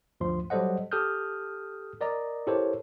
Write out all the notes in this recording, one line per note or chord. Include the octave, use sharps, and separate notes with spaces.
D2 G2 F3 C6
F#3 G3 A4 C5 D#5 F#5
G4 A4 D#6 F6 G6
A#4 D5 D#5 A#5
E4 G4 A4 A#4 C5 C#5